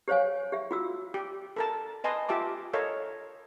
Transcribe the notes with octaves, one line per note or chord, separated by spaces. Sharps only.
G4 C5 C#5 F5 G#5
G4 E5
F4 F#4 E6
G4
A4 A#4 A5
B4 D#5 G#5 A5 C6
F4 G4 E5 A5 D6
A4 A#4 C#5 D#5 F5